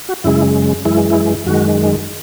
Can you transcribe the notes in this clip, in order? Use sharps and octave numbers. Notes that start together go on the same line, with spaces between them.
F#4
F#2 C#3 G#3 E4
F#2 E3 G#3 E4
E4
F#2 D#3 G#3 F#4